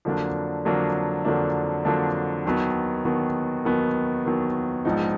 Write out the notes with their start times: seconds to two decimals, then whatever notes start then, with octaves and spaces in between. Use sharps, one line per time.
0.05 F2 D3 F#3 A#3 D4
0.65 F2 D3 F#3 A#3 D4
1.25 F2 D3 F#3 A#3 D4
1.85 F2 D3 F#3 A#3 D4
2.46 D#2 D#3 F#3 B3
3.05 D#2 D#3 F#3 B3
3.65 D#2 D#3 F#3 B3
4.25 D#2 D#3 F#3 B3
4.85 A#1 G#2 F3 B3 D#4